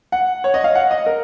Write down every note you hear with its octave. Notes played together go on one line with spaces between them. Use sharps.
F#5
C#5
D#5
F5
F#5
D#5
A#4